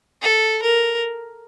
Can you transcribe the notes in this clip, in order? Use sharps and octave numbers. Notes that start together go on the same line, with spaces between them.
A4
A#4